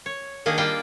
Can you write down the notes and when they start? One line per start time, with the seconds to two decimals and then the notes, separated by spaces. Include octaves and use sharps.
0.06 C#5
0.46 D#3 A#3 D4 G4 G#4
0.58 G3 A#3 F4 D5 G5